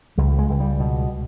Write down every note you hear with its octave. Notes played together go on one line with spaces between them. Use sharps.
C#2 G3
G#3
C#2
G3
B2